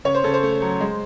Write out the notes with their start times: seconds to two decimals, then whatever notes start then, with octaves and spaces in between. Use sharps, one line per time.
0.05 C#3 C#5
0.15 C5
0.24 C#3 A4
0.34 C5
0.43 A3
0.62 F#3
0.80 G#3